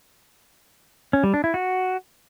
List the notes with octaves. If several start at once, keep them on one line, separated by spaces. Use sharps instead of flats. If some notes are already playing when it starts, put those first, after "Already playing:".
C#4
G3
D4
E4
F#4